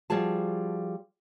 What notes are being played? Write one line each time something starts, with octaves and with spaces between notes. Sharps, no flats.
F3 G3 F#4 G#4 A5